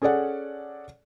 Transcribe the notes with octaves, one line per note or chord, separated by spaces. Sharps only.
C#4 G#4 A4 D5 F#5